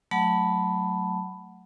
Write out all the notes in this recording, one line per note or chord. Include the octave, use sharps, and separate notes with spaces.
F#3 A3 F#5 A5 B5